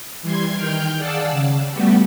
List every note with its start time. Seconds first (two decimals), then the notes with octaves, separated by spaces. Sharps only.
0.22 E3 G3 C6 G#6
0.55 D#3 G5 F6 G6
0.98 G#4 D5 F5 F#5 A5 E6
1.31 C#3
1.71 G3 A3 B3 F#4 G4